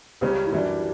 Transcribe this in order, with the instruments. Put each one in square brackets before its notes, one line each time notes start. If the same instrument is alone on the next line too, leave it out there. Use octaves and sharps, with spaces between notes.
[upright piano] C#2 C#3 G3 C#4 [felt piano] G4
[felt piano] E4
[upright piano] F#2 E3 G3 D4 [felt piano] F#4